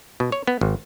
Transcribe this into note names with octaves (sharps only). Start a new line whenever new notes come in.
B2
C#5
B3
G#1